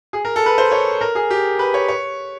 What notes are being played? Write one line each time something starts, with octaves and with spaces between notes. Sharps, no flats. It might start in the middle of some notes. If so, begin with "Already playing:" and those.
G#4
A#4
A4
B4
C5
C#5
A#4
G#4
G4
B4
C#5
C#5